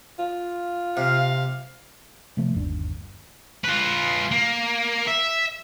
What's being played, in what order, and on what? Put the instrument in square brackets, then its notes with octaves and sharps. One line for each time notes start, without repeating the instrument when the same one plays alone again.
[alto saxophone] F4
[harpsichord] C3 [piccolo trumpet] F5
[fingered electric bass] C3 F3 A3 A#3
G1 D#2 D4
[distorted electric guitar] F4 B4
A#3
E5